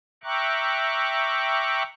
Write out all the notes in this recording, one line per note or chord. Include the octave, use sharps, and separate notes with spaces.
E5 G5 A#5 C#6 D6 F#6